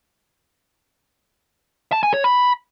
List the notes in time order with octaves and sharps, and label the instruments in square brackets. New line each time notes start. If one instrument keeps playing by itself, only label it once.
[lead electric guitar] A5
G#5
C#5
B5